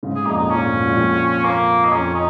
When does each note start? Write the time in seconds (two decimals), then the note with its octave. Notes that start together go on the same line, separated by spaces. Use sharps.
0.03 G#2 C#3
0.15 G#4
0.26 F2 A#2 D#4
0.38 D#4
0.50 F2 A#2 C#4
0.62 G#2
0.73 G#2
0.85 F2 A#2
0.97 F2 A#2
1.44 A#3
1.85 D#4
1.91 F2 C#4
2.15 D#4